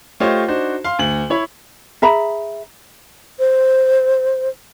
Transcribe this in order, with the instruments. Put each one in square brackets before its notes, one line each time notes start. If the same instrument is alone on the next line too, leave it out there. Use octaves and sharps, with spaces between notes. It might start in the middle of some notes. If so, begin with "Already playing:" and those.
[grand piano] A3 F4 G4 C5 C#5 D#5
D4 D#4 F#4 C5
F5 C6
D2 F#7
E4 C#5 B5
[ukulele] G#4 E5 A#5 B5
[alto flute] C5